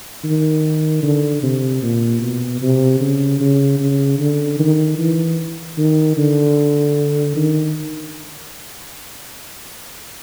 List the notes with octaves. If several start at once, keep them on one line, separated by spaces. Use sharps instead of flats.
D#3
D3
C3
A#2
B2
C3
C#3
C#3
C#3
D3
D#3
E3
D#3
D3
D#3